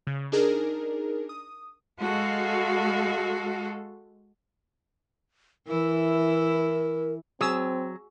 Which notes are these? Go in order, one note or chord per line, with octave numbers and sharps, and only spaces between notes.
C#3
D4 D#4 G#4 A#4
D#6
G#3 F#4 A4 F5
E3 E4 A#4
F#3 C4 G#4 D#6 E6